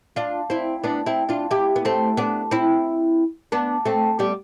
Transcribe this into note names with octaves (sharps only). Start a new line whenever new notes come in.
D4 F4
C4 E4
B3 D4
C4 E4
D4 F4
E4 G4
B3
A3 C4
B3 D4
C4 E4
B3 D4
A3 C4
G3 B3